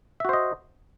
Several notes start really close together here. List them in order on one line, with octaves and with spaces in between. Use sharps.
E5 F#4 C5 D#5